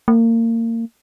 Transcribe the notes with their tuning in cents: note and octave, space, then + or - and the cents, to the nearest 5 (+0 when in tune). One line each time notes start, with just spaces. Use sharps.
A#3 -30